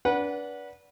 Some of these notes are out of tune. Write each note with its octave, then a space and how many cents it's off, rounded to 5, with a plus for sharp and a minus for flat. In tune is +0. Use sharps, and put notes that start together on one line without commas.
D4 -30 B4 -25 F#5 -5